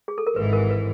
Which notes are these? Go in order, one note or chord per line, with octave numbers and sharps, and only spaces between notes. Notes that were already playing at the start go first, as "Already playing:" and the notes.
G#4
A4
A#4
G#1 G#2 E3 B4
A#4
B4